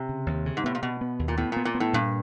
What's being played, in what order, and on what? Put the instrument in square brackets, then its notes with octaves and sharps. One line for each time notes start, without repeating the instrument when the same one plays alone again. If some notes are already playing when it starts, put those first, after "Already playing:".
Already playing: [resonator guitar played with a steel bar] C3
[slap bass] C#3
D#2
C#3
[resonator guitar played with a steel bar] G#2
[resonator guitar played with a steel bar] A2 [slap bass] B3
[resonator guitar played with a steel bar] A#2
[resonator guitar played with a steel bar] B2 [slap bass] B3
[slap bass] B3
D#2
[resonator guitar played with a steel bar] A#2
[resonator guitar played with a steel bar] A2 [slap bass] B3
[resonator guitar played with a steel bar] A#2
[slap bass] B3
[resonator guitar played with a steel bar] A#2
[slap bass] B3
[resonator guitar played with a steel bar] A2
[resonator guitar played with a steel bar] G2 [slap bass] A#2